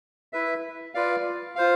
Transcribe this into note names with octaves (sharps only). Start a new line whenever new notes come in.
E4 B4 E5
F4 B4 D5 F5
F4 C5 F5